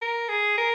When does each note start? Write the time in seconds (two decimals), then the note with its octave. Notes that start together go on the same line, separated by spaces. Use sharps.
0.02 A#4
0.29 G#4
0.57 A#4